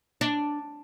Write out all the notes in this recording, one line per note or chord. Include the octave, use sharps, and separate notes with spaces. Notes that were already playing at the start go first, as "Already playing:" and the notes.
D4